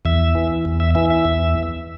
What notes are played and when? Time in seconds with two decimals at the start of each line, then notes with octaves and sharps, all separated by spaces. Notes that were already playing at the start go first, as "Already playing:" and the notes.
0.05 E2 E5
0.35 E3
0.65 E2
0.80 E5
0.95 E3 E5
1.10 E5
1.25 E2